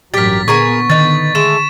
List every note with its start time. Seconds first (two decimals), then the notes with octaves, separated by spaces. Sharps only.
0.14 A1 G2 F#3 G4 A#4 A6 B6
0.48 A#2 D3 B3 G#4 A#4 G#5 C#6
0.90 D3 D#3 B3 D#4 A6
1.35 G#3 A3 E7